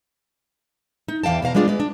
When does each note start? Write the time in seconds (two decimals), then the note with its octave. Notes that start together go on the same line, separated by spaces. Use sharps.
1.08 D#4
1.23 E2 E3 F5 G5 A5
1.42 E2 B2 F5 A#5
1.54 G3 G#3 B3 D4 F4 G#4
1.68 G#3 B4
1.80 D4